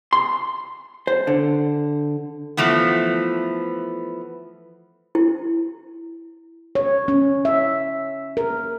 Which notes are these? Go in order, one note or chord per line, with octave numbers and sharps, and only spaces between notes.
C6
C5
D3
E3 F3 A3 B3
E4
C#5
C#4
E5
A#4